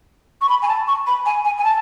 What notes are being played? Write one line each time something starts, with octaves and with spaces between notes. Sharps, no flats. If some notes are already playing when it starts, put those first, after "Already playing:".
C#6
B5
G#5
A5
C#6
B5
G#5
G#5
G#5
A5